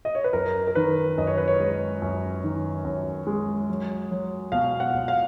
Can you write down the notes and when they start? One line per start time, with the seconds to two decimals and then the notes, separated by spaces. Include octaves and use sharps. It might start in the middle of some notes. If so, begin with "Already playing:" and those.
0.05 D#5
0.15 C#5
0.24 B4
0.33 F#2 A#4
0.67 A#4
0.75 D#3 B4
1.17 F#2 D#5
1.27 C#5
1.37 B4
1.48 C#5
1.60 G#3
2.02 F#2
2.44 D#3
2.85 F#2
3.27 G#3
3.69 F#3
4.11 F#3
4.52 B2 F5
4.80 F#5
4.94 B2
5.08 F5